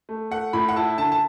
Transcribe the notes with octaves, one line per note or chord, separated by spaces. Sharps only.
A3
A3 F#5
A2 B5
F#5
E4 A5
D3 A5
A5